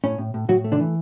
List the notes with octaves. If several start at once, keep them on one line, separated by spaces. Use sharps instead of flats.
A2 C#4
A2
A2
A2 F#3 F#4
A3
D3 D4
E3